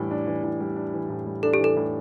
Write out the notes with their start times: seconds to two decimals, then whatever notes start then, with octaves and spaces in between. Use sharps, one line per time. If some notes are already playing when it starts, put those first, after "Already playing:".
Already playing: A2 E3 G3 D4
0.11 D4
0.27 E3
0.43 A2
0.60 G3
0.76 D4
0.94 E3
1.10 A2
1.27 G3
1.43 D4 A4
1.54 G4
1.60 E3 A4
1.77 A2